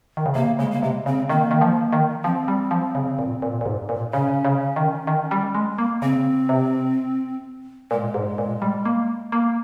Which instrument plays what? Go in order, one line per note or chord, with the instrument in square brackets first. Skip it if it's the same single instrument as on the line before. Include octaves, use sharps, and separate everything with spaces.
[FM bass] D#3
C#3
[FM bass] C3 [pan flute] A#3
[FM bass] C#3 [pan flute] G#3
[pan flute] A#3
[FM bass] C3 [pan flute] G#3
[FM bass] C#3 [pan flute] C4
[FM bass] D#3 [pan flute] A#3
[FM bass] D#3
F3
D#3
[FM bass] F3 [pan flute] C4
[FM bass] G3
F3
C#3
A#2
A#2
A#2
G#2
A#2
[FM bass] C#3 [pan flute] C#4
[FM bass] C#3
D#3
D#3
G3
G#3
A#3
[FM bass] C#3 [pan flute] C4
[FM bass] C3
[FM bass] A#2 [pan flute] G#3
[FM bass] G#2
A#2
G3
A#3
A#3